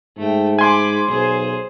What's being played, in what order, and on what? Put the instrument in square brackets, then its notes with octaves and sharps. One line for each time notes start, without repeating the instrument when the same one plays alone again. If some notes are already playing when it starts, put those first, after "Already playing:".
[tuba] G#2 [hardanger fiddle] A3 G5
[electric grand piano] G#5 C6 [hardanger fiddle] B5 D6
[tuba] B1 [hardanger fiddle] G#4 C5